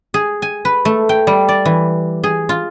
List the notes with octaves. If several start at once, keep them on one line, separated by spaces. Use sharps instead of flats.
G#4
G#5
B4
A3
G5
G3
D5
E3
G#4
F4